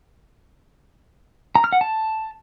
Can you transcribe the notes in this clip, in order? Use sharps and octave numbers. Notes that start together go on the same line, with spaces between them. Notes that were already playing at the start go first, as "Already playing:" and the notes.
A#5
F6
F#5
A5